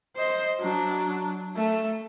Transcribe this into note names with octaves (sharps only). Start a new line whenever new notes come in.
C5 D#5
F#3 D4
A3